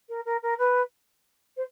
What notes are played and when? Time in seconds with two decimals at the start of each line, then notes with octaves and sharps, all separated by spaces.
0.09 A#4
0.25 A#4
0.42 A#4
0.58 B4
1.57 C5